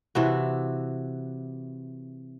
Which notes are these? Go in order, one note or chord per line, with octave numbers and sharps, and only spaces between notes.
C3 E3 F#4